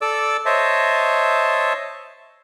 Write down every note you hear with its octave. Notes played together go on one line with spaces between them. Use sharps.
A4 D5 D6 E6
C5 C#5 D#5 E5 A5